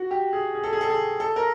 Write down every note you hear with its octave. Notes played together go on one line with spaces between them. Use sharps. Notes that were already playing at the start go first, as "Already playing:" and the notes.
Already playing: F#4
G4
G#4
G#4
A4
G#4
A4
G#4
A4
A#4